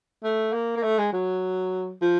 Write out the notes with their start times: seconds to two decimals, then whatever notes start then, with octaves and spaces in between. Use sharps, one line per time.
0.24 A3
0.53 A#3
0.77 A#3
0.83 A3
0.99 G#3
1.13 F#3
2.02 F3